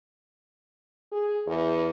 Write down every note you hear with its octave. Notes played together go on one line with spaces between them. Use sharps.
G#4
E2